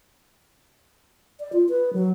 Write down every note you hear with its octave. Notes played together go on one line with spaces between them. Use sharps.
D5
F4
B4
F#3